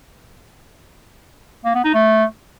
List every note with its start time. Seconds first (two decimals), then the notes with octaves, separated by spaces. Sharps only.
1.65 A#3
1.75 B3
1.84 D#4
1.94 A3